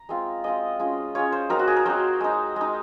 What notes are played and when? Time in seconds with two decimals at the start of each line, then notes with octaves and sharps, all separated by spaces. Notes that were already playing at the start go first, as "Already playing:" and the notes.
Already playing: A#5
0.09 G#3 C4 F4
0.44 G#3 C4 F4 D#5
0.79 G#3 C#4 F4
1.15 G#3 C#4 F4 C#5
1.32 C5
1.50 F#3 C4 D#4 A#4
1.59 F#4
1.67 G#4
1.76 A#4
1.86 F#3 C4 D#4 C5
2.20 G#3 D#4
2.56 G#3 D#4